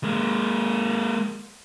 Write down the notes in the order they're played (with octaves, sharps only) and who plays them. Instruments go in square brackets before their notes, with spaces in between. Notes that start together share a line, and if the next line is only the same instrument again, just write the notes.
[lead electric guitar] G#3 A#3